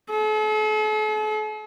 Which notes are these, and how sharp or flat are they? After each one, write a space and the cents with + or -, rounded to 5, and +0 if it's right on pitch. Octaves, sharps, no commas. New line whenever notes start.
A4 -45